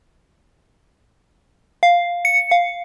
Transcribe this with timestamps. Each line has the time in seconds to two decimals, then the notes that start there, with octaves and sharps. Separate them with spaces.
1.83 F5
2.25 C#7
2.51 F5